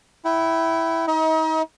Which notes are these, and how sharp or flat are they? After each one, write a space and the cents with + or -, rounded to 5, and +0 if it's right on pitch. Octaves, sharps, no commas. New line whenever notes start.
E4 +0 G5 -40
D#4 +35 D#5 +45